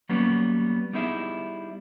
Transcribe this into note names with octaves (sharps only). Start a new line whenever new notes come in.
F#3 G3 A#3 B3 C#4
G3 B3 D#4 E4 G#4 E5